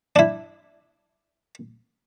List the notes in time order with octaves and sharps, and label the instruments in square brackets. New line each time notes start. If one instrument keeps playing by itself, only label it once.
[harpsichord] D4 E4